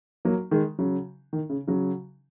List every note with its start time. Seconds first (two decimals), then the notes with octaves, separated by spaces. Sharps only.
0.25 F#3 A#3
0.51 D#3 G#3
0.79 C#3 F#3
1.33 D#3
1.50 C#3
1.68 C#3 F#3